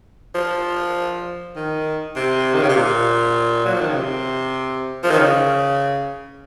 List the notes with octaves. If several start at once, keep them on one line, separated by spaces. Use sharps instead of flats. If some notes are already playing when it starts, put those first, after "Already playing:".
F3
D#3
C3
D#3
C#3
C3
A#2
F#3
F3
D#3
C#3
C3
F3
D#3
C#3